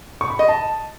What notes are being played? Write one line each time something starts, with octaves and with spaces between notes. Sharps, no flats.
C#6
B5
D#5
A5